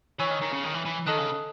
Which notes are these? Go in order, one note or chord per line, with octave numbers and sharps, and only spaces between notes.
E3 C#5 G#5 C#6 E6
D#3
D#3
C#3
D#3
E3
E3
D#3 A4 D#5 A5 D#6 F#6
C#3